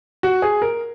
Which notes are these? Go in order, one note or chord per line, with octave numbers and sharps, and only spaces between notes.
F#4
G#4
A#4